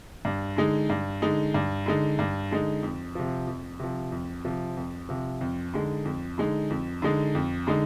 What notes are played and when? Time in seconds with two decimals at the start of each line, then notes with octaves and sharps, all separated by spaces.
0.25 G2
0.57 D3 G#3 D#4
0.90 G2
1.22 D3 G#3 D#4
1.54 G2
1.86 D3 G#3 D#4
2.19 G2
2.51 D3 G#3 D#4
2.83 F2
3.15 C3 F3
3.47 F2
3.79 C3 F3
4.12 F2
4.44 C3 F3
4.77 F2
5.09 C3 F3
5.41 F2
5.74 D3 G#3 D#4
6.05 F2
6.38 D3 G#3 D#4
6.70 F2
7.02 D3 G#3 D#4
7.35 F2
7.67 D3 G#3 D#4